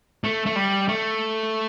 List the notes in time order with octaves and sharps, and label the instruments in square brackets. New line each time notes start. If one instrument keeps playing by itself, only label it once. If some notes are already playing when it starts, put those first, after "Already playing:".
[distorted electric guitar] A3
A3
G3
A3